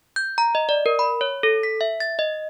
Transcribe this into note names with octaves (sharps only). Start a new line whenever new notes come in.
G6
A#5
D#5
D5
A#4
B5
C#5
A4
B6
E5
A6
D#5